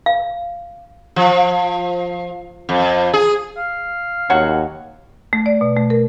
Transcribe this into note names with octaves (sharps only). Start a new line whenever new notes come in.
F5
F3
F2
G#4
F5
D#2 F#3 F#4 C#5
A3
D5
B2
A3
A#4